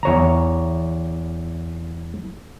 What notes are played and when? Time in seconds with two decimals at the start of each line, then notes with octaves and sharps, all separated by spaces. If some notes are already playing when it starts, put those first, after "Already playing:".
0.03 E2 C#5 A#5